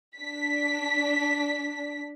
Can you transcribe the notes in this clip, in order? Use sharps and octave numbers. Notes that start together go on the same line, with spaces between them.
D4 B6